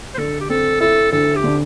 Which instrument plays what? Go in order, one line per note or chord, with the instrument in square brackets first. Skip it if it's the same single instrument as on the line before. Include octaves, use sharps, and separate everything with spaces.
[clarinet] C5
[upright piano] D3 [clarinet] A4
[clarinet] G4
[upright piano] C4 [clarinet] A4
[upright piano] E4 [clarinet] A4
[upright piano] D2 [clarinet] A4
[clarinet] G4
[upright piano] D3